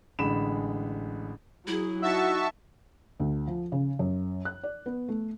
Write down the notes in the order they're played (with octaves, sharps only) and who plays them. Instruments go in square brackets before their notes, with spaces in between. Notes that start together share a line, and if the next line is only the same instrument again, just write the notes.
[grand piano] A1 D3 G#3 B5 E7
[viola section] F#3 G#4 [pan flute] E4
[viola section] D#4 [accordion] F#4 E6 [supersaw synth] E5 A5 C#6
[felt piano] D2
F3
C#3
F#2
F#6
D5
B3
A3